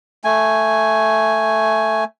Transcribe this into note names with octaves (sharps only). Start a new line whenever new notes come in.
A3 G#5